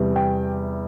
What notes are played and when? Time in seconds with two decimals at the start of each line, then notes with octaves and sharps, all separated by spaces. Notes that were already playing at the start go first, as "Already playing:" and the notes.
Already playing: E2 C3 G3
0.16 G5